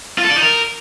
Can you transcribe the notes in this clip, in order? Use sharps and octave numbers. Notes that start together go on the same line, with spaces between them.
F4
A4
D5
D#4
A#4